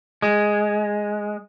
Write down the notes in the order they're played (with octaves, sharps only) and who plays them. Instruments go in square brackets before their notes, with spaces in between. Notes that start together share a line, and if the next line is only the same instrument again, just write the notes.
[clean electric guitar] G#3